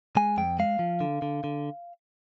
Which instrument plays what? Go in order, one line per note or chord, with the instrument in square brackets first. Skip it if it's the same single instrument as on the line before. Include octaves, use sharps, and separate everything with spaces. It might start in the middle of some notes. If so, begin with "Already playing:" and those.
[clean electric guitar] G#3 G#5
F2 G5
G#3 F5
F3
D3
D3
D3